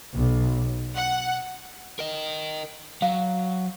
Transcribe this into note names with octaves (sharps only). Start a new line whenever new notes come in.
B1
F#5
A#4 D#5
F#3 F5